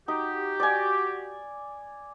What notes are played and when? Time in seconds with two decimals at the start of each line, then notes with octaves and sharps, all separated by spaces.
0.08 D#4 F#4 G4
0.60 D5 G#5